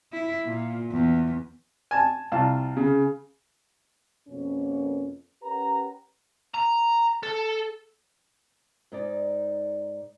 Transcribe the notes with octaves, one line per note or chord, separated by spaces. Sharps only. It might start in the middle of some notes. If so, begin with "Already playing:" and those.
E4
A#2
E2
G#5 A5
C2 F4 A5
C#3
F2 B2 A#3 C#4
C#4 G4 A#4 B4 F#5 A#5
A#5
A4
G#2 D#4 D5